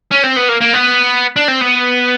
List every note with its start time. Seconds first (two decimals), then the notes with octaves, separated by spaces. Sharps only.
0.11 C#4
0.23 C4
0.36 B3
0.48 A#3
0.61 A#3
0.73 B3
1.36 D4
1.48 C4
1.61 B3